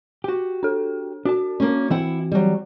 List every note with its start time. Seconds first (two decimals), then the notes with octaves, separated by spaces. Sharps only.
0.24 F#4 G4
0.63 D4 A4
1.25 D4 F#4 D5 A5
1.60 A#3 C#4
1.91 E3 C4 E4 F#5
2.32 F#3 G3